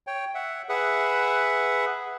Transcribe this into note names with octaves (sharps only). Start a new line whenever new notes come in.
C#5 G5
E5 F#5
G#4 B4 E5 F#5